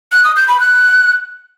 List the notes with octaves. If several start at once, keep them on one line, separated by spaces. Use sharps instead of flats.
F#6
D#6
G6
B5
F#6